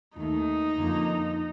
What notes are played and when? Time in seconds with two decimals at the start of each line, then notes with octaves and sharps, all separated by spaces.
0.17 D#2 D#3 A3 D#4
0.76 F2 D3 F3 A#3